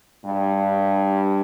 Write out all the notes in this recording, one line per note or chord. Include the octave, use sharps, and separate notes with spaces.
G2